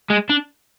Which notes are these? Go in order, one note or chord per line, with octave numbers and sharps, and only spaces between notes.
G#3
D4